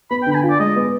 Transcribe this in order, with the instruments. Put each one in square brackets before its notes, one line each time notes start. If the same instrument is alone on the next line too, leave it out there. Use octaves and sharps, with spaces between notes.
[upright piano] B3 [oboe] B5
[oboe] G5
[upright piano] D3 [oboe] B5
[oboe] G#5
[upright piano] F4
[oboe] D5
[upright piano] G#3 [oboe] D#5
[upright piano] B3